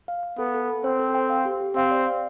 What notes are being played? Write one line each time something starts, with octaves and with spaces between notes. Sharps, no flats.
F5
F5
B3 A4
A4
A4
C4 C5
A4
G5
F5
G4
G4
C4 F5
D5
F5